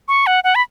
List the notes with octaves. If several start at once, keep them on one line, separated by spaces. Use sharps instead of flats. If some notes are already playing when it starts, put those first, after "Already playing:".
C#6
F#5
F#5
B5